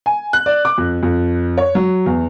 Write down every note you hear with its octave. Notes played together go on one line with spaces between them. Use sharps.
G#5
F#6
D5
D6
F2
F2
C#5
F#3
E2